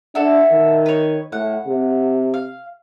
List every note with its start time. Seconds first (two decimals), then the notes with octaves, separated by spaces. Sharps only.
0.15 D4 E4 F#4 A4
0.52 D#3
0.86 B4 C#5
1.32 A2 F#5
1.67 C3
2.34 F5